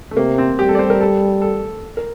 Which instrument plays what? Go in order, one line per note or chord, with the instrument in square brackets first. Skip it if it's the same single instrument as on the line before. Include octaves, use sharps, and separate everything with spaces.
[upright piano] A3
[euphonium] C3 [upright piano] A#3
[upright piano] C4
[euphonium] G3 [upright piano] G4
[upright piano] A4
D5
C5
A#4
A4
A4
A#4